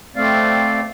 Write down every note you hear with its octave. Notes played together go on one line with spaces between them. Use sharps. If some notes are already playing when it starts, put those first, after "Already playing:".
A3 C4 D5 F5